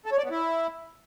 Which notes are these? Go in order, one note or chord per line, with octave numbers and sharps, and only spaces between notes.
A4
C#5
D5
B3
E4